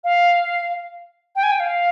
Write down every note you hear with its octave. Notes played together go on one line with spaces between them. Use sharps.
F5
G5
G#5
G5
F5